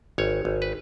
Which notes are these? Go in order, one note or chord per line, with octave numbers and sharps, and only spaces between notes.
G#1 C#5
G#1
B4